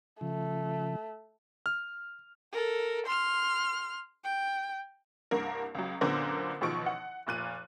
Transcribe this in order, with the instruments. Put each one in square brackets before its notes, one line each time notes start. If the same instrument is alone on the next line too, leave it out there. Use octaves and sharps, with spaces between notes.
[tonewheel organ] C#3 F3 [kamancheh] A3
[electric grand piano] F6
[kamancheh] A4 A#4
C6 F6
G5
[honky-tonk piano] C2 G2 A#3 A#4
C#2 F#3
F#2 A#2 D3 B3 A#4 C5
A1 B2 D#3 F3 C#6 D7
F#5
F1 A#2 F#6 D#7